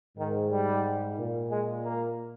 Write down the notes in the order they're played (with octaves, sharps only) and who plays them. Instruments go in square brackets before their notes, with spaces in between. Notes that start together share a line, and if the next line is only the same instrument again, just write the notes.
[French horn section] G#2 [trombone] D#3
[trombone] G3
[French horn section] A#2
[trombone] G#3
A#3